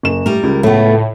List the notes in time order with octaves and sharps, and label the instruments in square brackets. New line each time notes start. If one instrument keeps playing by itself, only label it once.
[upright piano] F#1 E7
[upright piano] A2 [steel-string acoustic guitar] G3 A#4
[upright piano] C#2
[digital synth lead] A2 [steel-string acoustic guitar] A3 B3